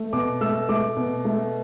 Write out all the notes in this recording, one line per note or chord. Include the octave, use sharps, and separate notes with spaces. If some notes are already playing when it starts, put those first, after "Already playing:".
Already playing: A3
B2 D6
A3 E6
A3 D6
B2
A3